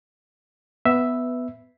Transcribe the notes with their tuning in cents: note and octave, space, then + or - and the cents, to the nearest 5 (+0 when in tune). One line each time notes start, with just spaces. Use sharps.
B3 +10 B4 +0 E5 +0